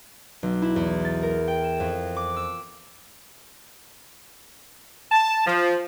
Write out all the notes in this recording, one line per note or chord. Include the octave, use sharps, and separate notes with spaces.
B1
E4
E2
A6
A#4
G5
E7
F2
D6
E6
A5
F3